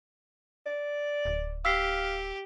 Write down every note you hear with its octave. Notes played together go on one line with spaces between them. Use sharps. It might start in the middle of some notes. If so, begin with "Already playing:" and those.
D5
D1
G4 F5 E6 B6 C7